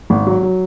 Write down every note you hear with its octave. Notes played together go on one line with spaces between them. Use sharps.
G#1
F#3
F#3